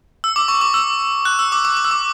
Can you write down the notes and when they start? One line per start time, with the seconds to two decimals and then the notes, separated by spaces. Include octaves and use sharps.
0.24 E6
0.36 D6
0.48 C#6
0.61 D6
0.74 E6
1.25 F#6
1.39 E6
1.52 D6
1.65 D6
1.77 D6
1.85 E6
1.91 D6